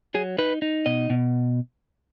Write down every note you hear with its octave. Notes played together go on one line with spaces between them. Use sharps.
F#3 G#4
D#4 B4
D#4
B2 D#5
B2